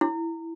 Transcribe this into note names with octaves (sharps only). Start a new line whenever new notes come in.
E4